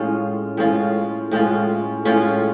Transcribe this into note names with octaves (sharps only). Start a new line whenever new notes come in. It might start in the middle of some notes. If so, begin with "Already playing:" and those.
Already playing: A2 G#3 C#4 F4
A2 G#3 C#4 F4
A2 G#3 C#4 F4
A2 G#3 C#4 F4